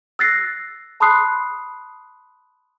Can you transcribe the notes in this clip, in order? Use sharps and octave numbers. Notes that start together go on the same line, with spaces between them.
E6 F#6 A6 A#6 C7
A5 B5 C6 D#6 F#6 C7